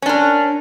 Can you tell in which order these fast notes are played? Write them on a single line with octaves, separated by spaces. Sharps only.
C#4 D4 A#4